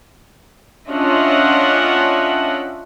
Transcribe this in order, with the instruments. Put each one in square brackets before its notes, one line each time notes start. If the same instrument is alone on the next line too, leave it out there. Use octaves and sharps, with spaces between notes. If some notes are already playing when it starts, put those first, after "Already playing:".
[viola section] C#4 D4 F4 D#5 E5 F#5